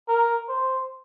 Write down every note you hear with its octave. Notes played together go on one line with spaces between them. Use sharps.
A#4
C5